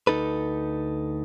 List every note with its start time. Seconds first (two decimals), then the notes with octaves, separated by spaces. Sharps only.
0.07 D2 D#4 A4 B4